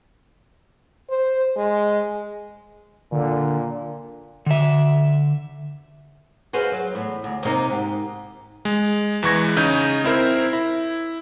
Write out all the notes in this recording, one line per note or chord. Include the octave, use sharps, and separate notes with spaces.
C5
G#3
A#2 D3
D3 E5
F#4 G#4 B4 C5 D#5 F5
F#3
E2 A2
D2
C3 A#3 D#4 C5 D#5
G#2 G4
G#3
E2 E3 G#3 C#6 G#6 A#6
C#3 D#4 D#5 G6
C4 E4 A#4 C5
E4